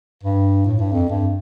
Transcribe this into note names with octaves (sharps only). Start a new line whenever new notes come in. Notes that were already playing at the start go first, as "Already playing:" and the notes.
G2
A2
G2
F2
G2